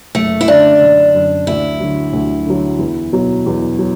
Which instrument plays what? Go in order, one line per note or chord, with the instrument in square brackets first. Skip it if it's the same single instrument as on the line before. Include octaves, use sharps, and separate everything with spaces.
[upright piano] F#1 [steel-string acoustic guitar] A3
[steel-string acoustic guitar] E4
[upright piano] F#2 D3 [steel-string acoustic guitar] D4
[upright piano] F#1
F#2 D3
[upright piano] D2 [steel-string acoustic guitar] E4
[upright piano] D3 F#3
D2
D3 F#3
E2
B2 F#3
E2
F#3